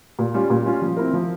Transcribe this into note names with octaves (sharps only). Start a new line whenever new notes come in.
A#2
G3 C#4 F4
A#2
G3 C#4 F4
F3
C4 E4 A#4
F3